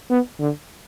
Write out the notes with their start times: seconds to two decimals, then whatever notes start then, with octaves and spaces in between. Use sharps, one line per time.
0.10 B3
0.40 D3